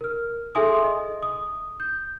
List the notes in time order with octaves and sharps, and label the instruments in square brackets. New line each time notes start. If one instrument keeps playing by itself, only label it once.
[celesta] A#4 F6
G#4 A4 E5 G#5 C6 D#6
D#5
D#6
G6